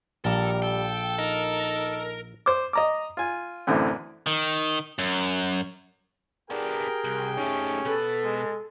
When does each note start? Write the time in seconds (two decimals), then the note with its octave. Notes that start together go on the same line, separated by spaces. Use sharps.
0.25 A#1 G3 A4 A#4
0.62 A4 G5
1.19 D#4 A#4
2.46 C5 D6
2.73 D#5 A#5 D6
3.17 F4 G#5
3.67 A1 F#2 D3 E3 C4
4.27 D#3
4.99 F#2
6.51 B3 D4 G4 G#4 A#4 G5
7.04 C2
7.38 D#3 A3 C#4
7.85 B2 A4 B4
8.24 G#3